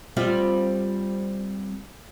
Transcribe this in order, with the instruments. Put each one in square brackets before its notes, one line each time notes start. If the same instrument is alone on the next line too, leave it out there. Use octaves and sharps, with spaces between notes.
[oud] G3 C4 F4